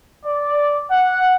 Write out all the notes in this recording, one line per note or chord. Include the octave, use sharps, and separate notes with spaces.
D5
F#5